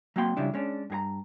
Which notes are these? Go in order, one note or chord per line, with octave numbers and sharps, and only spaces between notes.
F#3 A#3 C4 G5 A5 C6
C#3 F3 G3 D4 E4
G#3 C#4 D4
G2 G#4 A#5